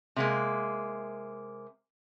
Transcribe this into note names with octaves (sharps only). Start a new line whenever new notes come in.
C3 G#3 A#3